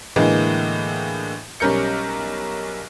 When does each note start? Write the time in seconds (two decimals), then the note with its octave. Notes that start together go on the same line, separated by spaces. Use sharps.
0.16 A2 D3 E3 G#3 A#3
1.60 B1 G3 C#4 A#4 G6 C#7